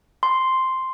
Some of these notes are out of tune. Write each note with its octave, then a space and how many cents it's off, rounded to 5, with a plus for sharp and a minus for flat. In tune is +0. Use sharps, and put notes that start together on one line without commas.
C6 +0